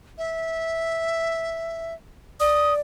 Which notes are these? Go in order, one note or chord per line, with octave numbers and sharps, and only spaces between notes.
E5
D5 D#6